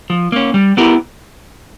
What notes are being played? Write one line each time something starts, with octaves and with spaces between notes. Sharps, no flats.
F3
A#3 C#4
G3
B3 E4 G4 A#4